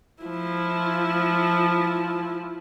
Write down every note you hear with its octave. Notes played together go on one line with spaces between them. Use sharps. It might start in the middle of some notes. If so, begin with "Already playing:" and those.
F3 E4